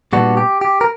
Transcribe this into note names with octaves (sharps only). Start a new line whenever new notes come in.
A#2 G3 B3 D4 F#4
G4
G4
A#4